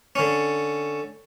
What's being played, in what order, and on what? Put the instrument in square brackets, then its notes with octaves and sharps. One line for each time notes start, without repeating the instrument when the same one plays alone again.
[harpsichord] D3 C#4